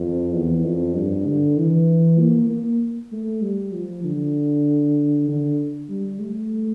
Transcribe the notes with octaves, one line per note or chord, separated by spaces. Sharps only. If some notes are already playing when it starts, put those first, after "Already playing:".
Already playing: F2
E2
F2
G2
D3
E3
A#3
A#3
A3
G3
F3
D3
D3
G3
A3